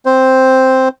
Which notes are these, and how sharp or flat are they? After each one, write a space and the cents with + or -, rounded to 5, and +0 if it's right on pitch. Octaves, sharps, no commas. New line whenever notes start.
C4 +0 C5 +0